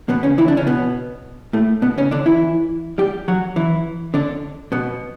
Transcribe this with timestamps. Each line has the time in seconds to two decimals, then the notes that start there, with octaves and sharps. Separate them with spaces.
0.09 B2 B3
0.23 C#3 C#4
0.38 E3 E4
0.48 D3 D4
0.57 C#3 C#4
0.67 B2 B3
1.53 A2 A3
1.82 B2 B3
1.98 C#3 C#4
2.11 D3 D4
2.26 E3 E4
2.98 G3 G4
3.28 F#3 F#4
3.56 E3 E4
4.14 D3 D4
4.72 B2 B3